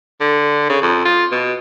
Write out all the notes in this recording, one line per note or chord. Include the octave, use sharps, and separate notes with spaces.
D3
C#3
F2
F4
B2